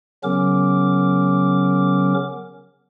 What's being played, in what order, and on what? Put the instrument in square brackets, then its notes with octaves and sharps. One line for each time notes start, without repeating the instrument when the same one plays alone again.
[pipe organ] C#3 F#3 B3 C#4 A#4 D6